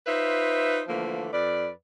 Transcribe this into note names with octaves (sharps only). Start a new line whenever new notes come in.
D#4 F4 B4 C5 E5
D3 E3 F3 A3 A#3
F2 B4 D5